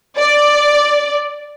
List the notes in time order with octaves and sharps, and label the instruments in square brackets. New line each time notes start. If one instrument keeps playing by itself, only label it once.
[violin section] D5